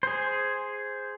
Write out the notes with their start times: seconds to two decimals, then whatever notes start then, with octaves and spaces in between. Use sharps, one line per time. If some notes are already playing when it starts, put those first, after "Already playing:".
0.03 G#4 C5